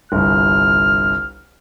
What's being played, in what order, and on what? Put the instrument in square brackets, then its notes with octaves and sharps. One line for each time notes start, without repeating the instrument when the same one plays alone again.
[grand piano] G1 C2 [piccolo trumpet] F6